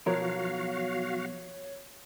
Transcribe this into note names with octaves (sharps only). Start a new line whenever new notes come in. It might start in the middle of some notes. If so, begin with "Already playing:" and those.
B1 F3 B3 F#4 A#4 C#5 F5